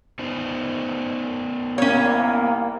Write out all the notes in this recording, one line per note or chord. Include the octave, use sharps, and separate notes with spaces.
B3 D#4 C5
C2 A#3 C#4 C#5